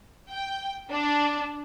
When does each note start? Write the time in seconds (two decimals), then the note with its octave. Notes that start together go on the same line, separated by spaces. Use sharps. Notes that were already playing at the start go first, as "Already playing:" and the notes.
0.30 G5
0.91 D4